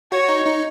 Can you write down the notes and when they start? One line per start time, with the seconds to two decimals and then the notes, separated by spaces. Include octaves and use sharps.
0.12 F#4 C#5
0.28 D#4
0.46 D#4